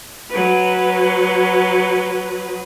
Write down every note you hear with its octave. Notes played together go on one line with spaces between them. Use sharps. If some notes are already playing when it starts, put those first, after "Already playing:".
F#3 B4